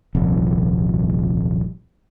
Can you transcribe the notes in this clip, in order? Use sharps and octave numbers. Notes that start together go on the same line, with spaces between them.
D#1 C2 F2